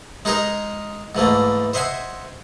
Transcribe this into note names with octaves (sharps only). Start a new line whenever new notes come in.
G#3 D#4 G#4 A#4 D#5
G#2 E3 A3 A#3
C5 D#5 E5 F#5 G#5 C6